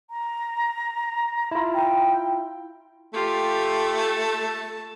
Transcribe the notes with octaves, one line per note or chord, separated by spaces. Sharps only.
A#5
E4 F4
G5
A3 F4 G4
A5